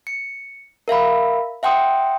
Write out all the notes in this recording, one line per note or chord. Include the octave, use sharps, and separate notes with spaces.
C#7
A#4 E5 F5 B5
E5 F#5 G5 C6 D#6